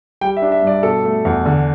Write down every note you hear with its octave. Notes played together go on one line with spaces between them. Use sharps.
G3 G5
E5
D4
E5
G2 D5
B2 A4
A3
E2
D3